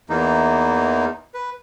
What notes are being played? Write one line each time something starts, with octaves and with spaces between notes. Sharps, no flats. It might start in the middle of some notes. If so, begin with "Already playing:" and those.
E2 E3 A#3 D#4
B4